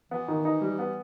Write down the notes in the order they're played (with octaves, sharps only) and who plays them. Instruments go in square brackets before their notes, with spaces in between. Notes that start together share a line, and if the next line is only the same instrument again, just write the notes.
[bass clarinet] E3 [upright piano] B3
[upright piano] D#3
D#4
G3
B3